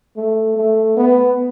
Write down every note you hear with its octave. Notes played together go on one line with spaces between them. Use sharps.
A3
A3
B3